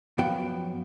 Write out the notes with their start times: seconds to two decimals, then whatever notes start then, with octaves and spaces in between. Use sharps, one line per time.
0.18 F#2 F3 B3 F#4 G5